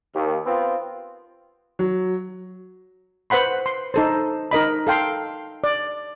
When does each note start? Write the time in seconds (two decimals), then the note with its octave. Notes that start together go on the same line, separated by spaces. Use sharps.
0.15 D#2
0.46 B3 C4 F4
1.79 F#3
3.30 B4 C5 F#5 B5 C6
3.66 C6
3.94 D#4 A4 C5
4.51 D#4 A#4 D#5 B5
4.87 A4 F5 G5 C6
5.64 D5